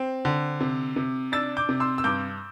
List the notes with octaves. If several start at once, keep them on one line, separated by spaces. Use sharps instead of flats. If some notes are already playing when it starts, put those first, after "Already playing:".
Already playing: C4
D3
C3
C3
D4 E6 A6
D6 G6
C3
C6 E6
E6
G2 D6 G6